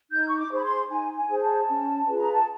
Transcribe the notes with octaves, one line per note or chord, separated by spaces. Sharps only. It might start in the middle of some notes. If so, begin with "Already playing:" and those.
D#4 G6
C#6
D6
G#4 C5 B5
C6
D#4 G#5
G#5
G#4 C5
A5
C#4
F4 G#4 B4
A#5
A5